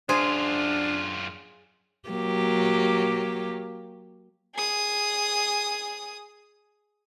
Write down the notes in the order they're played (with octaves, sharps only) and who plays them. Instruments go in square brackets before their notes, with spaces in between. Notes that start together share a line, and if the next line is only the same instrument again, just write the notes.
[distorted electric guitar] F#2 F4 [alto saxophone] D4 [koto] G#4 [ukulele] C5
[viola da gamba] F#3 A#3 G4
[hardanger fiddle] G#4 D#6